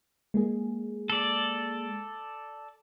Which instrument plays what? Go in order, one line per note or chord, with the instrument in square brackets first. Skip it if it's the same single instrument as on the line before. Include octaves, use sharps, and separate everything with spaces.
[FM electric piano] G#3 A#3 G#4
[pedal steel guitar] A4 D5